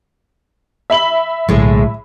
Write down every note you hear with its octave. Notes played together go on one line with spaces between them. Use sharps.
E5 B5 F#7
B1 A2 D3 F#3 G#3